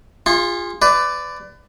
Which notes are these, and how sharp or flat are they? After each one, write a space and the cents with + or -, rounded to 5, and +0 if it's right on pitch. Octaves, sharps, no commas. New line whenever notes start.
F4 +0 G#4 -30 C6 +40
B4 +30 D5 +0